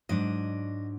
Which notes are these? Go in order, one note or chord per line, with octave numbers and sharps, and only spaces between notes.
G#2 F#3 D4 D#5